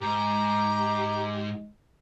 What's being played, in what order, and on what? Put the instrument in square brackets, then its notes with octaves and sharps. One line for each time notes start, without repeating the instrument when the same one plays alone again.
[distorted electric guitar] G#2 [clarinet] G#3 [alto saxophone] G4 [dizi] A#5